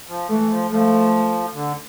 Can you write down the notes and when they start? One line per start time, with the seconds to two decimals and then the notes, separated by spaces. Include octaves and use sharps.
0.08 F3
0.29 E3 A3
0.50 F3
0.71 F3 A3
1.54 D3